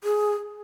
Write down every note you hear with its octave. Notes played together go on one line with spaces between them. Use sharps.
G#4